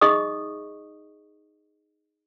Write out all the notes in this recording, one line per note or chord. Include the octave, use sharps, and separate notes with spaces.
D#4 G#4 D#5 E5 C#6 D#6